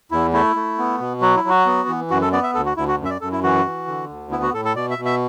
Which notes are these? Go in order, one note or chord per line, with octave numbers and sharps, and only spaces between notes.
E2 E4
A3 E4
A3
B3
B2
F#3 F#4
E4
F#3 F#4
B3
E3
F#2 F#4
A4
B3 D5
E5
D2 A4
F#4
D2 E4
F#4
F#2
E5
D5
F#2 A4
E4
E3 F#4
E3
D3
D2
B3 E4
F#4
A2 A4
A4
B2 D5
E5
B2
E5